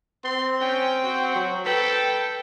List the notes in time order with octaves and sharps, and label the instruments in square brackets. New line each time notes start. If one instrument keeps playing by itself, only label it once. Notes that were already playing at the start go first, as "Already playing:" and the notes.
[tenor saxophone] C4 [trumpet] C6
[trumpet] C#4 [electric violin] G5
[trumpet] F#4
[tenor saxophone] F#3
[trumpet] A4 [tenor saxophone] B4 [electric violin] G5